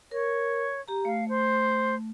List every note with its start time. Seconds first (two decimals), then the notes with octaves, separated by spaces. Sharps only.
0.11 A#4 C#5
0.88 G4 A#5
1.05 A3 F5
1.28 C5